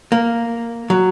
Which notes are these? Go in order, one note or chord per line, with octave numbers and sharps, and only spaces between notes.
A#3
F#3